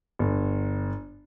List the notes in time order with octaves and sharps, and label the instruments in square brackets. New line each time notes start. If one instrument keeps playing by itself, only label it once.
[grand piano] G1